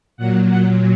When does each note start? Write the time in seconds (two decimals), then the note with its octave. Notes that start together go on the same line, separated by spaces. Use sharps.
0.17 A#2 F#3 F#5
0.47 A#2 F#3 F#5